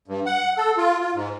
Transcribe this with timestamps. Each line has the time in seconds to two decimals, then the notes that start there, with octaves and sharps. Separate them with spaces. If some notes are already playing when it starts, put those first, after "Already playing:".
0.08 G2
0.26 F#5
0.57 A4
0.77 F4
1.00 F4
1.15 G#2